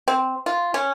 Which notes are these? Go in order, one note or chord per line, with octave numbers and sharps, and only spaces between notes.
C4
F4
C#4